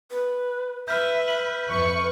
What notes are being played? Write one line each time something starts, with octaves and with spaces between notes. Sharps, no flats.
B4
B4 E5 F6 G6
E5 F#7
F2 B4 C#6